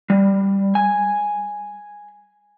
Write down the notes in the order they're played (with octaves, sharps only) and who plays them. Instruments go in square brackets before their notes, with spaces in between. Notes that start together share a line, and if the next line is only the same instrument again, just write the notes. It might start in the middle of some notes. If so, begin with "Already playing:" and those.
[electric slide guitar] G3
G#5